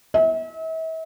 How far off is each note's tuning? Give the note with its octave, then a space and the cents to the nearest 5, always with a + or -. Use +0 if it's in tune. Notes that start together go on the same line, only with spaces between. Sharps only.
E5 -40